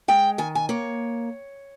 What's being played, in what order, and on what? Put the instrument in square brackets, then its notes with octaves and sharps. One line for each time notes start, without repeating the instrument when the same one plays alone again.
[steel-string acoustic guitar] G#3 G5
D#3 G#5
G#5
A#3 C#5